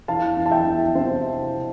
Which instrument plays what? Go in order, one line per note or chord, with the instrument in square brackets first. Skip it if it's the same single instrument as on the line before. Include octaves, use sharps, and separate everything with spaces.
[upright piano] E2 F5 A5
E2
A5
E5 G5
E2
C3 C5 E5